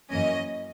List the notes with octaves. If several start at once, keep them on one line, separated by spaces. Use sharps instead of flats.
F#2 E3 A#3 C#4 D#5